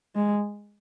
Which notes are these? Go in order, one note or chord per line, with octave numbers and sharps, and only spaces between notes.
G#3